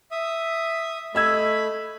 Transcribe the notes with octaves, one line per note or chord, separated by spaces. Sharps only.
E5 D#6
A3 D#5 B5 E6 G#6